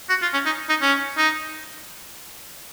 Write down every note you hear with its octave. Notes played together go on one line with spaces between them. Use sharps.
F#4
F4
C#4
D#4
D#4
C#4
D#4